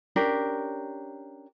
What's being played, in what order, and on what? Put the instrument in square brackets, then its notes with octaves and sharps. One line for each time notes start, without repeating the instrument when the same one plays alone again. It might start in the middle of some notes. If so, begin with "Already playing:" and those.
[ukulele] C#4 D4 G4 A#4